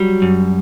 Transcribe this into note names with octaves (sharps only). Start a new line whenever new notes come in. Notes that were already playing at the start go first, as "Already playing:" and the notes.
Already playing: F#3 G3
F#2